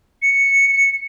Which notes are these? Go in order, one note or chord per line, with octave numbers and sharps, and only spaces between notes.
C#7